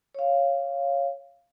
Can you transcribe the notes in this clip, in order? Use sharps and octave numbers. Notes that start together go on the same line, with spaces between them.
C#5 F5